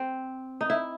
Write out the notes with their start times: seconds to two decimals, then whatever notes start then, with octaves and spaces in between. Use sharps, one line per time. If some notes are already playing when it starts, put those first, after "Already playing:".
Already playing: C4
0.61 D#4
0.70 E4